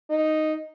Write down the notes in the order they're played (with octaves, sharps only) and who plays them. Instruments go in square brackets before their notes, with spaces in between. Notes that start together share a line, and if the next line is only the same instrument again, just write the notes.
[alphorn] D#4